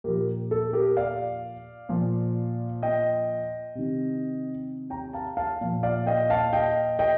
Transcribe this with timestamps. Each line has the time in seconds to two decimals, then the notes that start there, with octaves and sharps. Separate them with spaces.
0.04 A#2 F3 G4 A#4
0.51 A4
0.73 G4 A#4
0.97 D5 F5
1.89 A#2 F3
2.83 D#5 G5
3.75 C3 D#3
4.90 G5 A#5
5.13 F5 A5
5.37 F5 A5
5.61 A#2 F3
5.83 D5 F5
6.06 D#5 G5
6.30 F5 A5
6.53 D#5 G5
6.99 D#5 G5